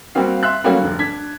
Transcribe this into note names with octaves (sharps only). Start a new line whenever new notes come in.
G3 A#3 C4 F#4 F5
E5 C6 F#6
F#3 G3 A3 A#3 C#4 F#4
F1 D3
D4 G#6 B6